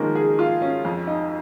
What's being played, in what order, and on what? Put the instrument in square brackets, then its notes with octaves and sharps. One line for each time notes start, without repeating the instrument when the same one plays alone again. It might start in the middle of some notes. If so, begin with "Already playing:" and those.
Already playing: [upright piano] D#3 C#4 [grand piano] F3 G#3 A#3
[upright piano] G#4
F4
C#4
F2
D#4